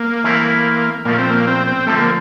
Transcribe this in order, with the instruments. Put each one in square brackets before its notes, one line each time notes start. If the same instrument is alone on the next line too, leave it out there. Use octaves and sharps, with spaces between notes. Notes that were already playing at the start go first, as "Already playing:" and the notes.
Already playing: [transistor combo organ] A#3
[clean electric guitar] E3 A3 C4 E4 A#4
[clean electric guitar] A#2 F3 A3 [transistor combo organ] A#3
[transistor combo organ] C4
A#3
C4
C4
[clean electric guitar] D3 F3 C4 [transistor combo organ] A3
[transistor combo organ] A#3